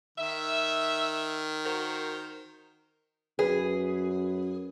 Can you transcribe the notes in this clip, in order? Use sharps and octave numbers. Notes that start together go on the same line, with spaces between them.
D#3 E5
F#4 A#4 C5
F#2 G#4 B4